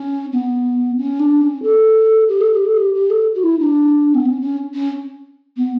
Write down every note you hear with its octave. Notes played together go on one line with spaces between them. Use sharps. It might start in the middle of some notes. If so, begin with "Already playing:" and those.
Already playing: C#4
B3
C#4
D4
C#4
A4
G4
A4
G4
A4
G4
G4
A4
F#4
E4
D4
B3
C#4
C#4
C#4
B3